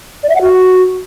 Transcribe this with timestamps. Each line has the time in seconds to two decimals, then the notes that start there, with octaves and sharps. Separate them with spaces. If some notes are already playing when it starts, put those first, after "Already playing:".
0.23 D5
0.29 E5
0.35 F#5
0.41 F#4